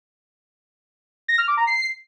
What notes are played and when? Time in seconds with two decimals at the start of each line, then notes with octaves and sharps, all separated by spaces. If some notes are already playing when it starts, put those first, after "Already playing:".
1.28 A#6
1.38 F6
1.48 D6
1.57 A#5
1.67 C7